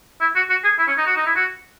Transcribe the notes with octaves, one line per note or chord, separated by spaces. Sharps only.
E4
F#4
F#4
G#4
E4
C#4
D#4
F#4
D#4
E4
F#4